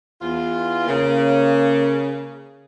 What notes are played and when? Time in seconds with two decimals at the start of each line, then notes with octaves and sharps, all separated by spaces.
0.22 E2 F4
0.88 C#3 A#3